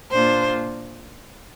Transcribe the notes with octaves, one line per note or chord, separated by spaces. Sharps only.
A#2 A#3 D4 F4 C5